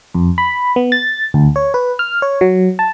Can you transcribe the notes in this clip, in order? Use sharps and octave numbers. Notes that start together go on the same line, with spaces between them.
F2
B5
B3
A6
D2
C#5
B4
F6
C#5
F#3
A5